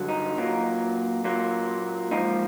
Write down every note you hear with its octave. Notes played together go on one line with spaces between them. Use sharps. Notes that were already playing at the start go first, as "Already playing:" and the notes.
Already playing: G2 D3 F#3
D#4
A#2 F#3 A#3
A#2 F#3 A#3
G#2 F3 A#3 D#4